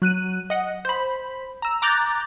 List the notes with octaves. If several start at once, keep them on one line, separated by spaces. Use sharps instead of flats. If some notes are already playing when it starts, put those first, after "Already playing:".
F#3 F#6 D#7
D#5 F#5
C5 B5
A#5 E6
A#5 D6 F#6 G6 A6